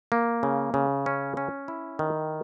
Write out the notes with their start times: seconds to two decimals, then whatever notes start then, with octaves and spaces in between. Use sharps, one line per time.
0.12 A#3
0.43 C#3
0.74 C#3
1.06 C#4
1.37 C#4
1.68 E4
1.99 D#3